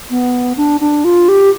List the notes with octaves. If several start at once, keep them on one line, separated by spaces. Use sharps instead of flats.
B3
D4
D4
F4
G4